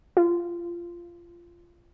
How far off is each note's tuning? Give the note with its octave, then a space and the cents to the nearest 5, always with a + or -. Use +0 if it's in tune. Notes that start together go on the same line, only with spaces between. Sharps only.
F4 -20